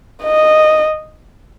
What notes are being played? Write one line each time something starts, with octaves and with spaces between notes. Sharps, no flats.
D#5